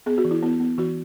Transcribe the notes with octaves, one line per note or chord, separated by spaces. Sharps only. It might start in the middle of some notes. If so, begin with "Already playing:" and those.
B3 G#4
F#4
E3
E4
B3 E4
B3
E3 F#4